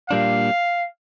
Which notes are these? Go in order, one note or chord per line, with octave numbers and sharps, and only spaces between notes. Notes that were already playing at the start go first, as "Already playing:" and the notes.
A#2 G3 A#3 D4 F5